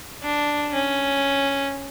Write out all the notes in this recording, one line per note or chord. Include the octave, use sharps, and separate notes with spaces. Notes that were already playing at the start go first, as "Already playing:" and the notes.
D4
C#4